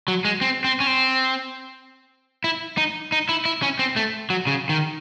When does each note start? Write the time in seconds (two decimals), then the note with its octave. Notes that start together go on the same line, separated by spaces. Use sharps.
0.08 F#3
0.25 G#3
0.41 C4
0.64 C4
0.80 C#4
0.87 C4
2.44 E4
2.78 D#4
3.12 D#4
3.29 E4
3.45 E4
3.62 C#4
3.79 C4
3.96 A3
4.30 F#3
4.47 C#3
4.69 D#3